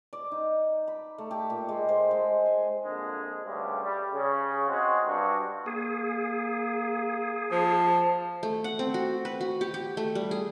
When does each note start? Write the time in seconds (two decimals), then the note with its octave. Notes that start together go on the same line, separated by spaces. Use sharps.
0.13 D5
0.32 D#4
0.88 B5
1.18 A3
1.31 G4
1.50 A#2
1.69 G#3
1.89 C5
2.11 G#3
2.46 G#5
2.84 A#1 F2 D3 G#3
3.44 D2 G2 C#3 G3
3.83 G3
4.14 C#3
4.68 G#3 C4 F#4 G#4
5.05 G2 F#4
5.66 A#3 G#4
7.52 F3 A5
8.43 A3
8.64 F#5
8.79 C4
8.94 F#4
9.25 B4
9.41 F#4
9.61 G4
9.74 G4
9.97 A3
10.15 G3
10.31 G#4